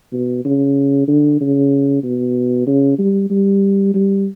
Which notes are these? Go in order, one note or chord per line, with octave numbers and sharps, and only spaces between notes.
B2
C#3
D3
C#3
B2
C#3
G3
G3
G3